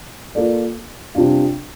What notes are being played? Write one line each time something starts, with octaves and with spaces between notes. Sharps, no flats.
A#3 F4 A4 D5
C3 G3 D4 F4